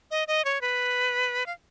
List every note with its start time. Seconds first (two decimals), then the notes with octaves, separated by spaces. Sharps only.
0.11 D#5
0.28 D#5
0.45 C#5
0.61 B4
1.46 F5